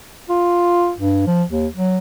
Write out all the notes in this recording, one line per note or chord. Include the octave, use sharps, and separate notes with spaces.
F4
G2
F3
D#2
F#3